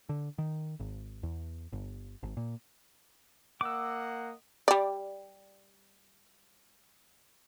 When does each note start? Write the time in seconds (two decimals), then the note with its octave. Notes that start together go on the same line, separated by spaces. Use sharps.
0.09 D3
0.38 D#3
0.80 G#1
1.23 E2
1.73 G1
2.23 G#1
2.37 A#2
3.61 A#3 D#5 F#5 D6 E6
4.68 G3 D5